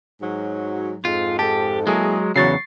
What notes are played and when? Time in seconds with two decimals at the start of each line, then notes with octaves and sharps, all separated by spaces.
0.22 G#2 F#3
1.05 F2 G#2 F4
1.39 G4 A4 A5
1.87 F#3 G#3 A#3 E4 G#4
2.36 E2 C#3 F#3 C#6 A6 C7